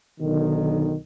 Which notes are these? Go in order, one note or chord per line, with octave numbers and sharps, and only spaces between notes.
B1 B2 D3 D#3